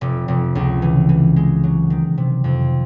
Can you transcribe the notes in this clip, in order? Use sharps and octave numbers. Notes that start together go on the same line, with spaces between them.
F1
F1
C#2
E3
E3
G#3
F#3
D#3
C3
F2